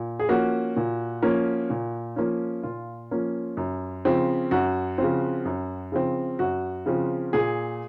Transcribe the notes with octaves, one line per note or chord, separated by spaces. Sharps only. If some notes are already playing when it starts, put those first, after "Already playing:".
Already playing: A#2
G#4
F3 A#3 C#4 F#4
A#2
F3 A#3 C#4
A#2
F3 A#3 C#4
A#2 F4
F3 A#3 C#4
F#2
C#3 F3 C4
F#2 F#4
C#3 F3 C4
F#2
C#3 F3 C4
F#2 F#4
C#3 F3 C4
A#2 G#4